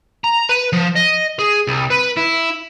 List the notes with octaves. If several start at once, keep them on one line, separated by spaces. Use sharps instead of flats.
A#5
B4
F3
D#5
G#4
C2
B4
E4